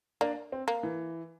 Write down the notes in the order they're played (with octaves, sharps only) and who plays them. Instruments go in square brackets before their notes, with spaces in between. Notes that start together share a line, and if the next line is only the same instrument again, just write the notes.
[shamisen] A#3 [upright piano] D4
[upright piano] C4
[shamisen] A#3
[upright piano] E3